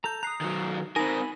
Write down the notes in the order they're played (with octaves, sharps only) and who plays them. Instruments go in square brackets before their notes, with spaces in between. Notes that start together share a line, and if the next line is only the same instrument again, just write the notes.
[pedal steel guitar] A4 A#5 [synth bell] G6 F7
[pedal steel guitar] A#5 D#6 [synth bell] F#6 C7
[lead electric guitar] D#3 F#3
[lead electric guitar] C4 A#4 [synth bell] D#4 A#6 [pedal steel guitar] G#5 B5